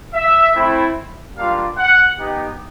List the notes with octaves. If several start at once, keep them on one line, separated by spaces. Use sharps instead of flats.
E5
A3 C4 E4
G3 A#3 D4 F4 F5
F#5
B3 D#4 G4